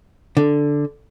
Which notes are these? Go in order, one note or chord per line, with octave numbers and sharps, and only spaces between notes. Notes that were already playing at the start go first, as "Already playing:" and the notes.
D3